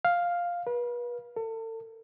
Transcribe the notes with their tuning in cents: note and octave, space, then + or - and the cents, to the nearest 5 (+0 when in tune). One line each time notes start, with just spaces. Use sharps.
F5 +5
B4 -35
A4 +35